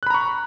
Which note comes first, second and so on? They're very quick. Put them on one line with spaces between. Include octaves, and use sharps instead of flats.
F#6 B5 A#5 C#6